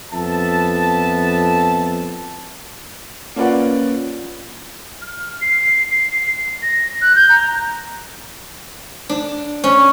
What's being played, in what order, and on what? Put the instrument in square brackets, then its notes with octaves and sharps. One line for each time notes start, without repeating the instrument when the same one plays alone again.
[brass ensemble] F2 B3 E5 A5
[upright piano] A#3 C#4 F4 B4 D5 F#5
[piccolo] F6
C7
A#6
F#6
G6
A#5
[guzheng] D4
C#4